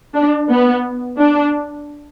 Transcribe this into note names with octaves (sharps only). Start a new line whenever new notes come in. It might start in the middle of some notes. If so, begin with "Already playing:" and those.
D4
B3
D4